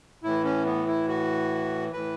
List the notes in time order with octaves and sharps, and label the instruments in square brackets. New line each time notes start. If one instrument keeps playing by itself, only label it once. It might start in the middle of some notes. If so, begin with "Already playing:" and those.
[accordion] A2 E3 E4
C#4
B3
E4
F#4
A2 E3 B4